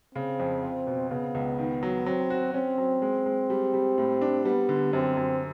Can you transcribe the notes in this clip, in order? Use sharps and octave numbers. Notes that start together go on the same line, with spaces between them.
C#3 C4
F2
F4
B2
C#3 B3
C#2
D#3
F#3
F#3 C4
F#4
C4 C#4
F#3
G#3
G#3
G3
G3
A2
D4
G3 B3
D3
F#2 C4
F#2